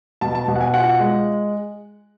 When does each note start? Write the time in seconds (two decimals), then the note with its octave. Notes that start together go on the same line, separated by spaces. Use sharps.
0.21 B2 A5
0.35 A5
0.48 B2
0.56 F#5
0.61 G#5
0.74 F4 F#5
1.00 G#3